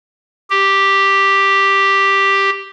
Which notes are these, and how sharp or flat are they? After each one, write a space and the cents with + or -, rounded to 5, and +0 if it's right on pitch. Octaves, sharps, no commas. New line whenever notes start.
G4 +0